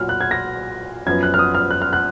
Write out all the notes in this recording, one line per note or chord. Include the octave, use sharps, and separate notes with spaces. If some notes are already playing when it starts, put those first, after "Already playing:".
Already playing: B1 A#2 F#3 F6
F#6
G#6
A#6
F#2 F3 B3 G#6
F#6
F6
D#6
F6
F#6
F6
F#6